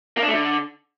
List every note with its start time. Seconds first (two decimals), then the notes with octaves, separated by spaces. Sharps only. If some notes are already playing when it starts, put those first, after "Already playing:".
0.17 A#3
0.23 D4
0.28 A3
0.33 D3